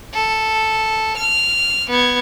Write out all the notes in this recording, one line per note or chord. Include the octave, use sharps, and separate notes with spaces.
A4
F6
B3 G#6